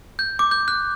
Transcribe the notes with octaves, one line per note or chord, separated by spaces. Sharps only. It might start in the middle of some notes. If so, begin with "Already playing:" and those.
G6
D6
G6
F#6